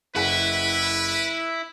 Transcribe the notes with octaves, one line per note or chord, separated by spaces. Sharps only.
F#1 E4 G#4 B4 F#5